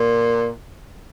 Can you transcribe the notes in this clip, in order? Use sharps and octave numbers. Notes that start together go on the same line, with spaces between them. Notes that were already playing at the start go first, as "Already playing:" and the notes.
Already playing: A#2